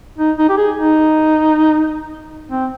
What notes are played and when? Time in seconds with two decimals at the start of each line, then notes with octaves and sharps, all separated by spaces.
0.18 D#4
0.38 D#4
0.49 G4
0.57 G#4
0.77 D#4
2.51 C4